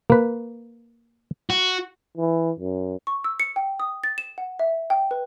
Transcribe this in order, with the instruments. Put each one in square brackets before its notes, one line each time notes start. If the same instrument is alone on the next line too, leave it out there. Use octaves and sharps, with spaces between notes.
[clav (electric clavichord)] A#3 B4
[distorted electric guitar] F#4
[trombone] E3
F#2
[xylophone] C#6
E6
C#7
G5
D#6
A6
E7
F#5
E5
G5
B4